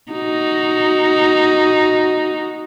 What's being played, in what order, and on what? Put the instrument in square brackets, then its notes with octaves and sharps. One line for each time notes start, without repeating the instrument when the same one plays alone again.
[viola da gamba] D#4 F#4